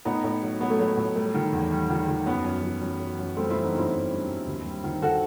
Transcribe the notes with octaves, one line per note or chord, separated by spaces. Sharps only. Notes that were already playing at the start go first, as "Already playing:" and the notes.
A2 B3 D#4
A2
F#3
F#3 B3
A3
F#3 B3
A2
G3 A3
D#3
E2
G3
D#3
D#3
F#2 B3
F#2
F#2
F#2
F#3
F#2
G3 A3 C4
E3 C4 E4
B3 D#4
G2 C4 E4
G2
G2
G3
D#2
G3
D#3
D#3 F#4 A4